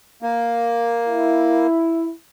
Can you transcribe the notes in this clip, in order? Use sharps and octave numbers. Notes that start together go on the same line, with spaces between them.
A#3
E4